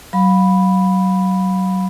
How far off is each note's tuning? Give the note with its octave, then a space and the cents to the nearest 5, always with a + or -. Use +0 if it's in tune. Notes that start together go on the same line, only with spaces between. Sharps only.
F#3 +25 F5 +25 B5 +0